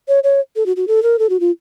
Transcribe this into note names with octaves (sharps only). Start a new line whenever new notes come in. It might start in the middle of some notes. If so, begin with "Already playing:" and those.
C#5
C#5
A4
F#4
F#4
A4
A#4
A4
F#4
F4